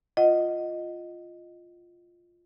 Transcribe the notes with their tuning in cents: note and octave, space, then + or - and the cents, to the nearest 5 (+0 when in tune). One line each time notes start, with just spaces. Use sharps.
F4 +0 D#5 +0 F#5 +5